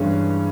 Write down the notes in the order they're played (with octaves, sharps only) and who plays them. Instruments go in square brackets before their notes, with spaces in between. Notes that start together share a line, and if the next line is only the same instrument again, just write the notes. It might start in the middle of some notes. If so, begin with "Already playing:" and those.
Already playing: [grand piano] G2 E3 G#3 C#4 [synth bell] G#4